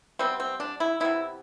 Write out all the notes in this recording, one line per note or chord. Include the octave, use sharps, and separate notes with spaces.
C3 G3 B3 C4
C4
D4
E4
C3 G3 B3 E4